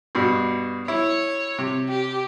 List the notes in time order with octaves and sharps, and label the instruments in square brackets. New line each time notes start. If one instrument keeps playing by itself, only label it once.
[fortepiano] G2 B2
[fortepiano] E4 [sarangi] C#5
[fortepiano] C3
[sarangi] G4